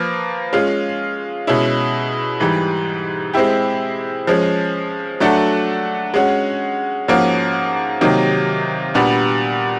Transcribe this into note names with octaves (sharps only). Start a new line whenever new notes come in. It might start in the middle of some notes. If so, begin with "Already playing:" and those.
Already playing: F3 A#3 B4
G#3 C#4 F4
B2 G#3 C#4 E4
G#2 E3 G3
G#3 C4 E4 G4
F3 G#3 C#4
F#3 A3 D4 F#4 A4
G#3 C#4 F#4
G#2 F3 A#3 C#4 F#4
C3 D#3 F#3 A#3 D#4
A#2 G3 B3 D4 F#4